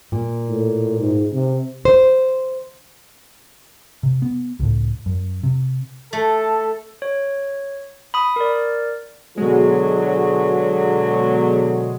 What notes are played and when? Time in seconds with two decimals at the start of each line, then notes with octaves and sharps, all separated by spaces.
0.12 A#2
0.49 A2
0.99 G#2
1.33 C3
1.85 C5
4.03 C3
4.22 B3
4.60 C#2 A2
5.06 F#2
5.43 C3
6.13 A3 A4
7.02 C#5
8.14 B5 D#6
8.36 A#4 D5
9.38 B2 D3 F#3 G#3 G#4